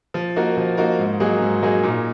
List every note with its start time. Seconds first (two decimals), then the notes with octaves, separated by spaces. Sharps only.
0.14 F3
0.36 A#3 D#4 F#4 A#4
0.57 F3
0.77 A#3 D#4 F#4 A#4
0.99 G#2
1.20 F#3 A#3 D#4 G#4
1.42 G#2
1.62 F#3 A#3 D#4 G#4
1.83 A#2